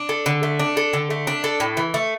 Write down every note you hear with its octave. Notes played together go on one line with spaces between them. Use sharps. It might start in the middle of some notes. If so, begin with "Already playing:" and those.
Already playing: D4
A4
D3
A3
D4
A4
D3
A3
D4
A4
A2
E3
A3